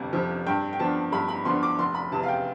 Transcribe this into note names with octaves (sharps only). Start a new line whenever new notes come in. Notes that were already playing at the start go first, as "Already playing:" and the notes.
Already playing: G1 F2 C3
F2 C3 F3
G2 G5
G5
F3 B3 D4 A5
G2 B5
B5
F3 B3 D4 C6
D6
F1 C6
B5
E2 C3 A5
F5
G5